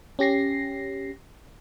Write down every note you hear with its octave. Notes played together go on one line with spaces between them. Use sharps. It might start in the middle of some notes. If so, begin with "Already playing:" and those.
C#4 G4 A#6 C7